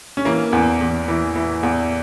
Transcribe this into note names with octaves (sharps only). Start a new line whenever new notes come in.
C#4
E3 A#3
E2
E2
E3
E3
E2